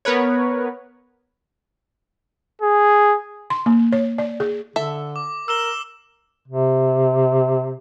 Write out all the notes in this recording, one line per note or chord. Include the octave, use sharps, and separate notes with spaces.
B3 A#4 B4 C#5
G#4
C6
A#3
C#5
D5
G#4
D3 A4 E5
D6
A#4 E6 E7 G7
C3